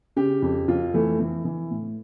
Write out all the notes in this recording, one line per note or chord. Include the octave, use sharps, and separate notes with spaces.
C#3 G4
F2
F2 F4
E3 A3
E3
E3
A2